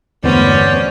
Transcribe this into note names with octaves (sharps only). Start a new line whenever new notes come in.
E2 G2 D3 A3 B3 C#4 C5 D5